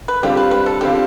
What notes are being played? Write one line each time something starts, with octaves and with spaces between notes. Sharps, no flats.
B4
D3 G3 C4 F4 G4
B4
B4
A4
D3 G3 C4 F4 G4